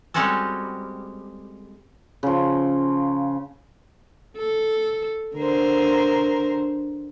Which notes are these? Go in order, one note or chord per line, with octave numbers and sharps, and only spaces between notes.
G3 G#3 C4 C#4 F#4 A4
C#3 F3
A4
D3 A#4 C5